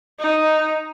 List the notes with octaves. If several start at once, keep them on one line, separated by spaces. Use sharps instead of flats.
D#4